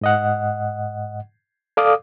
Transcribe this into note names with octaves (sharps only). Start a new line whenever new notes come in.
G#2 D#5 F#5
A4 D5 F5 D6 D#6